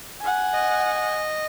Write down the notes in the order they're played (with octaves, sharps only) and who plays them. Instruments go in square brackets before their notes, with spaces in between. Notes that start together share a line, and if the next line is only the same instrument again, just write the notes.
[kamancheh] F#5 G#5
[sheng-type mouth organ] D#5